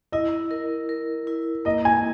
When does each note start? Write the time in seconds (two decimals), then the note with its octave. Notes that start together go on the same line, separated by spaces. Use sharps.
0.12 E4 D#5
0.51 A#4
0.89 A#4
1.27 E4
1.65 A#3 D#5
1.85 G#5